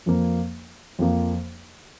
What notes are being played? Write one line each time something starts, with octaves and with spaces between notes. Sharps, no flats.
F2 F3 A#3
F2 F3 A#3